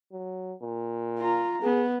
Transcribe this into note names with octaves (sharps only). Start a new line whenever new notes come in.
F#3
A#2
F4 A#5
B3 G#4